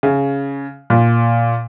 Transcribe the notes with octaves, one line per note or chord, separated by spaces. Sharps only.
C#3
A#2